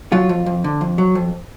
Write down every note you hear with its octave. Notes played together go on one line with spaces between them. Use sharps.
F#3 F4
F2
F2
D3
F2
F#3
F2